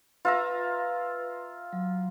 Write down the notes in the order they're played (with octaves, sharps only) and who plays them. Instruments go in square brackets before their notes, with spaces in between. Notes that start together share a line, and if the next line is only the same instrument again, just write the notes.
[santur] F4 E5 A#5 [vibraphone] B4
[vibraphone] F#3